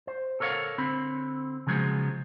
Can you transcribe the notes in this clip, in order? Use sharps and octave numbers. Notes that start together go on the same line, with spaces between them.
C5
A4 A#4 C#5 D5 F5 F#5
D3 C4 B5
C#3 F3 F#3 G#3 B3